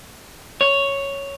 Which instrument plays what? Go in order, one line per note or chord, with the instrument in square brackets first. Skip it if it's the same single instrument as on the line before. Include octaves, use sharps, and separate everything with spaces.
[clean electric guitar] C#5